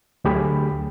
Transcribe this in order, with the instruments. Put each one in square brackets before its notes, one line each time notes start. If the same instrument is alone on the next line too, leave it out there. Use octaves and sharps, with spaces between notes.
[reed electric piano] D2 F#3 A3 G4 G#4 B5